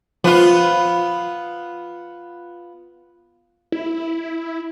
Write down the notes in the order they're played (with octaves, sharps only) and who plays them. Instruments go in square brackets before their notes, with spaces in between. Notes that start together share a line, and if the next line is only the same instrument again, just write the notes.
[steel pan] F3 [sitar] B3 F4
[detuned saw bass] E4